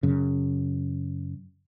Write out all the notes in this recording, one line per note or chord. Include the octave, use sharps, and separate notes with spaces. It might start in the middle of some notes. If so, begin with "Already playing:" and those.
F#2 C#3